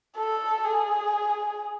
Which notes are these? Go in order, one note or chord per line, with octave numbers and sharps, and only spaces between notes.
A4
G#4